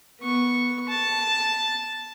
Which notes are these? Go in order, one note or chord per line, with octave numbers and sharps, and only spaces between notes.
B3 C#6
A5